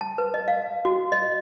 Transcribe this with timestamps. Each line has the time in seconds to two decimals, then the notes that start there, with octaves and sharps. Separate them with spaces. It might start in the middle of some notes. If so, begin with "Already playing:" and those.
0.01 A5
0.18 B4
0.34 D#5
0.48 F5
0.85 F#4
1.12 D#5